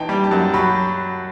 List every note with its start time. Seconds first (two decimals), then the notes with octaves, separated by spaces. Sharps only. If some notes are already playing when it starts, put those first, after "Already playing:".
Already playing: A1 E3 D#4 G5 A5
0.09 G3
0.24 A5
0.31 F#2
0.54 F#3 B5